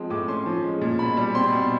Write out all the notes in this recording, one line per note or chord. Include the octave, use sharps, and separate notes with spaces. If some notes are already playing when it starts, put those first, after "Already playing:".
Already playing: F3 G#3 C4
A2 D6
C#4 C6
F3
G#3
A#2
B2 B5
G3
C4 C6
B2